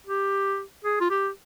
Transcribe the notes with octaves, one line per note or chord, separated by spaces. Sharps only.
G4
G#4
F4
G4